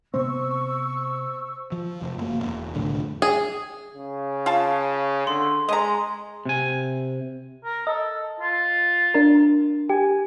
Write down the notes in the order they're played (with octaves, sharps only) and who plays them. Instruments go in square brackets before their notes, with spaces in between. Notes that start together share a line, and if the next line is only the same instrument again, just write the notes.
[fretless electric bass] C3 B3 C4 [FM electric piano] C5 [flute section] C#6 E6
[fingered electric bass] F3
F1
F#1 A#3
E1
C2 F2 A2 D3
[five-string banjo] G#4
[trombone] C#3
[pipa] F4 A5
[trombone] D3 [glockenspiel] C6
[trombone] G#3 [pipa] D#5 A#5
[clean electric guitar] C3 G#5
[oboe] A#4
[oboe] A4 [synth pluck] D#5
[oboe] F4
[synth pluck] D4 A#4
[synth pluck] G4 [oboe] G#5